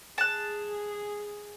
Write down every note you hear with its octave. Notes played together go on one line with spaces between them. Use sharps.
G#4 A5 F#6